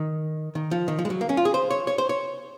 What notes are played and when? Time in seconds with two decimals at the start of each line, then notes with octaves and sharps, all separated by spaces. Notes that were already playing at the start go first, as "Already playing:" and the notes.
Already playing: D#3
0.55 D#3
0.71 F3
0.88 D#3
0.99 F3
1.05 G#3
1.10 F#3
1.21 A#3
1.29 C#4
1.37 F4
1.45 G#4
1.54 C5
1.71 C#5
1.87 C#5
1.98 C5
2.09 C#5